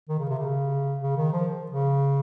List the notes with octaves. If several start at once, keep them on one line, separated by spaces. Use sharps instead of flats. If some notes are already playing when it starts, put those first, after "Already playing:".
D#3
C#3
C3
C#3
C#3
D#3
F3
C#3